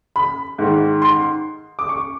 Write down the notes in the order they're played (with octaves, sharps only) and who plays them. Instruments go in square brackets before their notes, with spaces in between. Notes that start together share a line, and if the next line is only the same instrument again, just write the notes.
[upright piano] B5
G#2 D#3
C6
D6
C#6